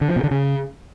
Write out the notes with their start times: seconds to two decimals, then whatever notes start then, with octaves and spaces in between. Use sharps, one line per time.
0.01 D3
0.09 F3
0.16 B2
0.24 D3
0.31 C#3